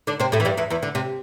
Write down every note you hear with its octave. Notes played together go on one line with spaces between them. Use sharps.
D3 D4
C3 C4
A2 A3
E3
G2 G3
E2 E3
E2 E3
D3
C3